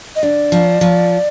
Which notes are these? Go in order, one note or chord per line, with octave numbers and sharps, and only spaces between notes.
D#5
D3 D5
F3
F3